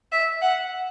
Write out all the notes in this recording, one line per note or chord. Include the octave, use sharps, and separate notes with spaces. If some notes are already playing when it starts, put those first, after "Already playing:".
E5
F#5